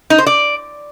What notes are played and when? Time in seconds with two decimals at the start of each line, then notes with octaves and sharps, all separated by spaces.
0.10 D#4
0.18 C5
0.26 D5